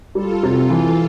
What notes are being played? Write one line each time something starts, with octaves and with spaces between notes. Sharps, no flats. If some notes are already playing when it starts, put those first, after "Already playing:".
G3 F4 A4
C3
E3